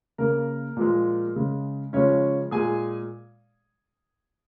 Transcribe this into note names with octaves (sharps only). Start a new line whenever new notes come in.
C#3 A#3 A#4
A#2 F3 G#3
C#3 G#3
C#3 F3 G#3 C#4 C#5
A#2 G#3 G#4 G#5